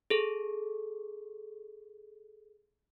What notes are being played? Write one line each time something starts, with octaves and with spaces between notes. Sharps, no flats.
G#4 A4